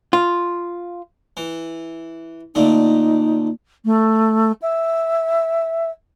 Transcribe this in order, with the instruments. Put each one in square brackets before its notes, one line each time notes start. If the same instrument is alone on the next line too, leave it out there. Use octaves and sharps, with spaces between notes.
[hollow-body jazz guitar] F4
[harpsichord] E3
[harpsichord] A#2 D3 A3 [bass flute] D#4
[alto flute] A3
E5